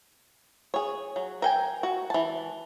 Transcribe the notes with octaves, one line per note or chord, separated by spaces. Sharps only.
G#4 C#5
F#3
A#4 G5 G#5
F#4
E3 A5